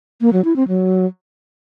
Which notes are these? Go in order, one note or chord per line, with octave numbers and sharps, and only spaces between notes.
A#3
F#3
E4
C4
F#3